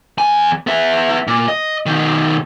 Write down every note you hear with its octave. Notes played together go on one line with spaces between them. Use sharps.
E2 G#5
B3 E5
A#2
D#5
B2 D#3